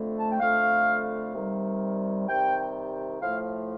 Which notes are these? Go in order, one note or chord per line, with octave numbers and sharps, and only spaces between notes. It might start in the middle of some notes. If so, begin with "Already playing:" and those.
Already playing: F2 D3 A3
A5
G5
F2 D3 A3 F5
C3 D#3 G3
C3 D#3 G3 G5
A2 F3 A3 F5